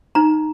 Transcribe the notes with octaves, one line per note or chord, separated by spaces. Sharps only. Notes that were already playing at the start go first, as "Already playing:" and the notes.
D#4 A#5